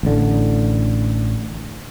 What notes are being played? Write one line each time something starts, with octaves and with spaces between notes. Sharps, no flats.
A1 D3